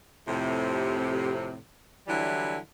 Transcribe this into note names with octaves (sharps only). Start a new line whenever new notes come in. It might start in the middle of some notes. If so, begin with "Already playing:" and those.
F2 A2 C3
D3 E3 F#3 G3 E4